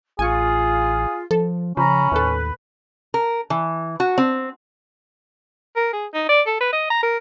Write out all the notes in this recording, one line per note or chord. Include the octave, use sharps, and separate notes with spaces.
A1 F4 G#4 G#5 C#6
F3 A4
C#3 F3 C#4 A#5 B5
D#2 A2 A4 B4
A#4
E3
F#4
C4
A#4
G#4
D#4
D5
A4
B4
D#5
A#5
A#4